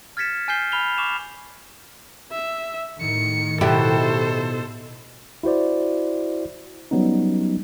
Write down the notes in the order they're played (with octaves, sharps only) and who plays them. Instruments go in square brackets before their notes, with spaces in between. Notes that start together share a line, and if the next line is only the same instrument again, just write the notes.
[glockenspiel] F6 G#6 A6 B6 C#7 E7
G#5 F6 G6 C7 G7
B5 F6 F7 G7
C#6 D6 E7 F7 G7
[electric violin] E5
[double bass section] A2 D#3 [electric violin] C#7
[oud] B2 E4 G4 [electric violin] A4 C5
[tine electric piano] E4 F#4 C5 D5
F#3 G3 B3 C#4 D#4